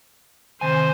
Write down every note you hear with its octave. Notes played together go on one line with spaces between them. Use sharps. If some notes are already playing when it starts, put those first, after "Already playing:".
C3 D#3 C5 G#5